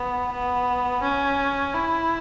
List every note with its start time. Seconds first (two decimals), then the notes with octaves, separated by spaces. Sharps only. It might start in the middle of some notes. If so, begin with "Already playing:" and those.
Already playing: B3
0.32 B3
1.03 C#4
1.74 E4